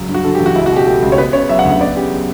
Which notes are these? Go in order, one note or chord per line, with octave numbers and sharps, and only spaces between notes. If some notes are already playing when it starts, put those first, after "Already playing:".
Already playing: C#2 F#3
G2
F#4
D3 A4
G4
A1
F#4
C#2 E4
F#4
B2 G4
A3 G4
C#2
C#5
B3 B4
C#3 C#5
F#3 E5
F#5
D2 E5
B3 D5
C#3 G4
F#3